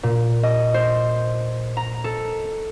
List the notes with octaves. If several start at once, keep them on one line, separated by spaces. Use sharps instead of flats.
A#2
D#5
C5
A#5
A4